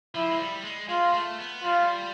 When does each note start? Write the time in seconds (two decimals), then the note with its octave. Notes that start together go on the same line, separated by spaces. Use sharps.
0.15 F3 E4
0.30 G#3
0.40 G3
0.64 G#3
0.89 G#3 F4
1.14 A3
1.39 B3
1.63 G3 F4